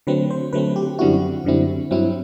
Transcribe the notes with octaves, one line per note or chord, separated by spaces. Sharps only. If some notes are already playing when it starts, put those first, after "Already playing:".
D3 F#3 A3 C4 B4
C5
D3 F#3 A3 C4 B4
G4
F#2 D3 G3 C4 E4 F#4
F#2 D3 G3 C4 E4
G2 F#3 C4 E4